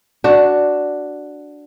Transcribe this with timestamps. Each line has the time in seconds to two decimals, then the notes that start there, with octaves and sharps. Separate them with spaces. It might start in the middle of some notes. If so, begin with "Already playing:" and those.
0.24 D4 F#4